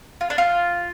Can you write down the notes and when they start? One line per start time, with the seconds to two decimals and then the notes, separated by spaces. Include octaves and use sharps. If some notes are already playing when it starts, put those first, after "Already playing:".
0.21 F4
0.30 D4
0.38 F4